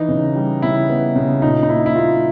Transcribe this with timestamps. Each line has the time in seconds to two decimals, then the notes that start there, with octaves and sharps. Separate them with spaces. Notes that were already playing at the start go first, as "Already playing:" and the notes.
Already playing: E3 D#4
0.08 C#3
0.36 G3
0.62 C#3 E4
0.89 B3
1.15 C#3
1.42 A#2 D#4
1.63 D#4
1.69 A#3 E4
1.86 E4
1.96 A#3 F4